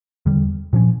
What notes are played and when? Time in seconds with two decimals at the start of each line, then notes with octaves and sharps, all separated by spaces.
0.26 E2 D3 G3
0.73 A#2 F3 C#4